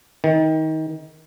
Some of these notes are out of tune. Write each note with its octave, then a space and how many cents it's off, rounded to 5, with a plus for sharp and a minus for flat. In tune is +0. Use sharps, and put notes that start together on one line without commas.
D#3 +25